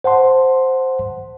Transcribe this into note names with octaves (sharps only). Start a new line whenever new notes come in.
C5 F#5 A5 C6